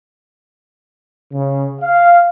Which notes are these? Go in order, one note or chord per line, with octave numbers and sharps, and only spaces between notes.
C#3
F5